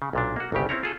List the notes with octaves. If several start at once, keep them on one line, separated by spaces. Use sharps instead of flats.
C#3
B1 A#2 D4
A#3 F#4
G1 C2 C#3 G4
C4 C#4 E4 C#5 A#5
F4 G#4 A4